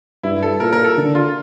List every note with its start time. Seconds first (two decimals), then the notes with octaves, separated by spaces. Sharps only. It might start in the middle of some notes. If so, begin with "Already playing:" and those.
0.23 G2 E4
0.43 A4
0.60 A#2 A#4
0.73 A#4
0.84 A4
0.97 D3
1.15 F4